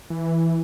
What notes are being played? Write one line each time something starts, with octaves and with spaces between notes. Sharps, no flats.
E3